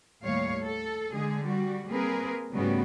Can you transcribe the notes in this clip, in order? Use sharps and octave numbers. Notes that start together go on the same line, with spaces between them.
D#2 A2 G3 A3 C#5 F5
A4
D3 G#3 G#4
G3 F#4
G3 A#3 C4 G#4 A#4 B4
G#2 C#3 G3 A3 B3 F#4